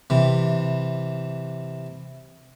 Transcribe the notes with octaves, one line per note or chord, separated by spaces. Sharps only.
C3 E3